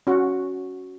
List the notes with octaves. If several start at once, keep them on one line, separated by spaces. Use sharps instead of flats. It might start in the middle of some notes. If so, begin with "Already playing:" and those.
C#4 F#4